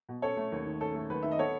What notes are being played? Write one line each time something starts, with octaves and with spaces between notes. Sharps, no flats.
B2
C#4 A4 C#5
A3
D#2
D#3
C#4 A4
A3
D#2 B4
D#3 E5
D#5
B3 A4 C#5